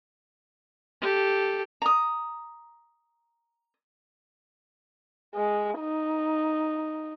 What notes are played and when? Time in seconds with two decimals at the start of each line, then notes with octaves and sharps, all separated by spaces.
1.01 G4 A4
1.82 A#5 D#6
5.35 G#3
5.79 D#4